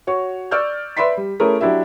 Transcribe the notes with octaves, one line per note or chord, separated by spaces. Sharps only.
F#4 C#5 C#6
D5 C#6 E6 F6 G6
B4 D5 E5 B5 C6 B6
G3
A3 C#4 E4 G#4 A#4
F#3 D4 E4 G4 E5